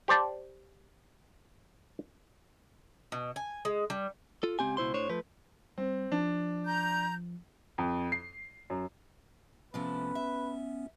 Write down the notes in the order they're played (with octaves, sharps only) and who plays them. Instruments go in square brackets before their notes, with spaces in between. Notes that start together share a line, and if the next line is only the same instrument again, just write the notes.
[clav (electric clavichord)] G4 C5 D5 A5
[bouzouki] B2
G#5
G#3
G3
[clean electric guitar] F4 A4
C#2 A3 C4 G4 G#5
C#2 B2 E4 C5 C6
A2 D4 C5 C#5
F3 A3 B4
[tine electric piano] G3 [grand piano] C4
[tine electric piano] F3 [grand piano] D4
[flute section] A#5 G6
[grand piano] F2
C7
F#2
[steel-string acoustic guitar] C3 F3 A3 [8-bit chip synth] B3 C#4 [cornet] B4
[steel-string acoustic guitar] E5